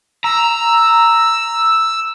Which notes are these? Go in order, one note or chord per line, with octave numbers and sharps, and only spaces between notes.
A#5 E6